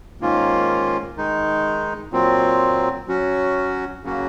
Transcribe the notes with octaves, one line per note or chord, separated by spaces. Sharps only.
G#2 D#3 A#3 C#4 F4
D#3 G#3 D#4
A#2 F#3 C4
F#3 C#4 F#4
C#3 F#3 A#3 C#4 F#4